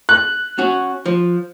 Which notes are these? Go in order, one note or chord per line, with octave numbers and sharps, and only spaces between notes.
F#6
C#4 F#4
F3